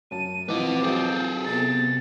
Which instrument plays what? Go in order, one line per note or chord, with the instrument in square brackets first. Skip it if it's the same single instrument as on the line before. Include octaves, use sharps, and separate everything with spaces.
[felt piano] F#2 A5 [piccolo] D#7
[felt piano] E3 F3 [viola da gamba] C4 [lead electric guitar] B4 D#5 [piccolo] D6
[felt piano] F#3 F4 [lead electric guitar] G#4 A4 [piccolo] G5
[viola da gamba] C3 B3 [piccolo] A6